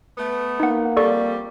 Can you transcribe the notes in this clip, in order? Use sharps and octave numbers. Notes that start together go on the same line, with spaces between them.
A3 B3
A#3 D#4 F#5
F2 G3 A4 D5 C#6